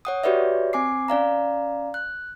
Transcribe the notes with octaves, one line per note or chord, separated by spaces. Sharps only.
C#5 F#5 D#6
F#4 G4 B4 C#5 D5 E5
C4 G#5 D6 C7
C#4 D5 F5 A#5
F#6